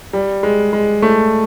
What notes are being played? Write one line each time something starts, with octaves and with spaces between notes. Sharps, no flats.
G3
G#3
G#3
A3